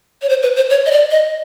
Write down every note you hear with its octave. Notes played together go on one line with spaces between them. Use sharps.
C#5
C5
B4
C5
C#5
D#5
D5
D#5